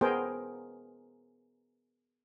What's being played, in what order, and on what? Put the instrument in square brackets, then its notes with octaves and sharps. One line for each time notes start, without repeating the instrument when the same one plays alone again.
[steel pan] B3 G#4 A#4 C5 G5